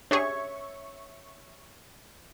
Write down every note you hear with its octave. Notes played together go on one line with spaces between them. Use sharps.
D4 G4 G#4 C#5 E5 C#6